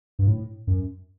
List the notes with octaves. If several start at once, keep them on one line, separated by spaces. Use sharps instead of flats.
G2
A2
F#2